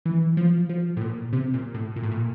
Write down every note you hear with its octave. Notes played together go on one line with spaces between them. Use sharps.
E3
F3
F3
A2
A#2
C3
A#2
A2
A#2
A2
A#2